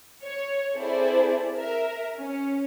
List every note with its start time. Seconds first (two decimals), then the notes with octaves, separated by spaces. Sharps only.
0.23 C#5
0.76 C4 E4 G#4 A4 C5 D5
1.56 A#4 E5
2.17 C#4